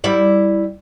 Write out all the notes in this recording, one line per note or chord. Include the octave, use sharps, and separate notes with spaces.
G3 E4 D5